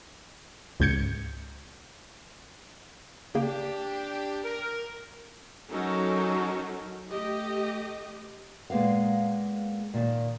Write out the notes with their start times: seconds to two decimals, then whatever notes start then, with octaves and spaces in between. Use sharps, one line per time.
0.80 C#2 G#2 G6 G#6 C#7
3.35 C#3 A#3 D4 G4
4.44 A#4
5.69 F#3 C#4 D#4 F#4 A4 A#4
7.09 A3 G4 D#5
8.70 A#2 G#3 A#3 B3 F5
9.94 A#2 D#3